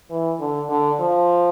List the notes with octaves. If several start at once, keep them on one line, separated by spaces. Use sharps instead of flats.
E3
D3
D3
F3